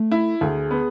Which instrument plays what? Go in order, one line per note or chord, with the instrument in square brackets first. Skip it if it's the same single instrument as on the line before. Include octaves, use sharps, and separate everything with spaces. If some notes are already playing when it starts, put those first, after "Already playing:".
Already playing: [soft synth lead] A3
[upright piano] E4
[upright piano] D2 [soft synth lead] G#4
[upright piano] B3